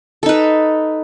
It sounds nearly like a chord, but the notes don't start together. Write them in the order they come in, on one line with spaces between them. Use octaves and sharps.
A4 D#4 B4